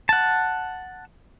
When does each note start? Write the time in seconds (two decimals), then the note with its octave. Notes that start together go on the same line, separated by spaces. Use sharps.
0.09 F#5 A5